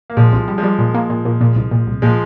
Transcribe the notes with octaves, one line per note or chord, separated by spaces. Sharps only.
A#3
A#2 F3 G#3
C2
G3
F3 G#3
G3
A#2
A#3
A#2
A#2
A#2
C2
A#2
C2
A#2 F3 G#3